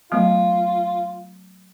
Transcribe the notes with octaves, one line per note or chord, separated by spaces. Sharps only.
F#3 A3 B3 F4